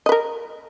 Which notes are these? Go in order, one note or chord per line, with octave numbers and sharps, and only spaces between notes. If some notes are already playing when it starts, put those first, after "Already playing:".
A#4 B4 D#5